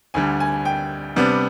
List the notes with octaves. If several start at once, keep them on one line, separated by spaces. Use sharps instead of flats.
D2 D3 G3 G#5
G#5
G5
C3 G3 B3 D4